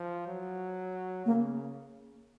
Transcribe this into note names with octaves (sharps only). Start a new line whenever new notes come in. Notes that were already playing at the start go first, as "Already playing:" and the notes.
Already playing: F3
F#3
C#3 A#3